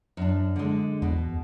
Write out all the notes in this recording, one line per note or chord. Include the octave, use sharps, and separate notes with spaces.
F#2 D4
D3 G#3
E2 B2